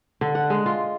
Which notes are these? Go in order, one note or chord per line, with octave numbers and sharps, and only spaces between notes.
D3
F#5
G#3
F4